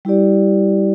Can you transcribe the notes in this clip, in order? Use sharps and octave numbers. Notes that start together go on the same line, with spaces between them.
G3 E4 G4 D5